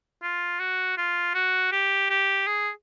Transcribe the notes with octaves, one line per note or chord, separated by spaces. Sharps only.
F4
F#4
F4
F#4
G4
G4
G#4